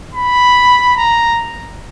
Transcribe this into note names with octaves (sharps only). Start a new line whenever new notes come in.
B5
A#5